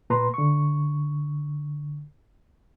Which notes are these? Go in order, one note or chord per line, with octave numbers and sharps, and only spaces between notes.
A#2 B4 A#5 C6
D3 C#6